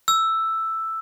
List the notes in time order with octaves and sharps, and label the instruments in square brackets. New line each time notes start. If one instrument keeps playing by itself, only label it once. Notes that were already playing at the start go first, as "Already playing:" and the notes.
[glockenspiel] E6